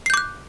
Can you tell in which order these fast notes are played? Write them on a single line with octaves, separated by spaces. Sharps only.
C7 G6 D6 F#6